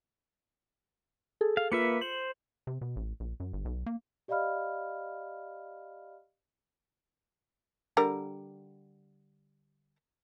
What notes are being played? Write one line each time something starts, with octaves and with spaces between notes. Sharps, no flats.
G#4 A4
F5
A#3 F4 B4 E5 C#7
C5 F#7
C3
B2
A1
A#1
F#2
G1
B1
A#3
G4 D5 D#5 F5 B5 F6
D3 G3 A#4